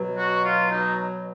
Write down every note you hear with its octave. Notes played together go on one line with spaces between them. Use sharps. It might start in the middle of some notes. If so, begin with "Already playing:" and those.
Already playing: B2 F#3
F#4
F4
D#4